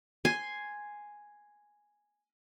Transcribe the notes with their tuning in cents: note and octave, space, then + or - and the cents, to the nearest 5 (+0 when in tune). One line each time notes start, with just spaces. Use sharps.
G#5 +0 C6 +0